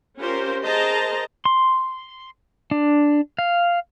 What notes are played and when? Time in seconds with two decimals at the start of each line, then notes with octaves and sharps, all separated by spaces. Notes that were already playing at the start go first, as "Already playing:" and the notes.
0.19 C#4 F4 G4 A#4 C5
0.63 G#4 A#4 C5 D#5 A5 A#5
1.45 C6
2.71 D4
3.39 F5